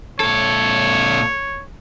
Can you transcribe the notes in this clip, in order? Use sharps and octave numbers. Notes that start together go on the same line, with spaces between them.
A#2 A4 C#5